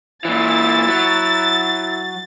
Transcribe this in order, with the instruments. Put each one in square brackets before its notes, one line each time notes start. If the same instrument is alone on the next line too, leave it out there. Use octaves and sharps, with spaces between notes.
[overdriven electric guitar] A#2 E3 [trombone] E4 [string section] A6
[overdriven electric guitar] F#3